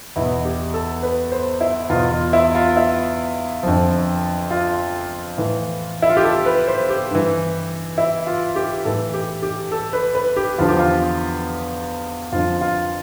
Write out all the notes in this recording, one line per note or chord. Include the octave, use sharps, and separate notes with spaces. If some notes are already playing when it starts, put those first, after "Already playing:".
E2 B2 E4
G4
A4
B4
C5
E4
E2 B2 F4
F4
E4
F4
E4
F2 D3 F3
F4
A2 E3
E4
F4
G4
A4
B4
C5
G4
G2 E3
E4
F4
G4
A2 E3 A4
G4
G4
A4
B4
B4
G4
E2 D3 F3 F4
G4
F4
F2 D3 F3 F4
F4